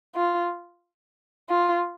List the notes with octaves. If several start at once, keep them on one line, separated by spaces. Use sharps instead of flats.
F4
F4